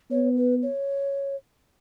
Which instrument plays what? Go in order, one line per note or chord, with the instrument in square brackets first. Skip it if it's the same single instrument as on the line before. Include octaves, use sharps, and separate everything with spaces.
[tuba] B3 [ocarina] C#5
[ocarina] B4
C#5